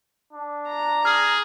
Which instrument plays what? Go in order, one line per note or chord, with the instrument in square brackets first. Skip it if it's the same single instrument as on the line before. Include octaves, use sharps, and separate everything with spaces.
[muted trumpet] D4
[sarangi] A#5
[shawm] G#4 [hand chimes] F6